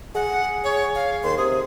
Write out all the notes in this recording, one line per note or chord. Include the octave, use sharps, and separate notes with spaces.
G#4 F#5
C#5
F5
D#2 C6
C3 G#4